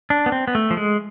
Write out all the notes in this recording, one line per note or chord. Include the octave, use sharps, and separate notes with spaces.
D4
B3
C4
B3
A3
F3
G#3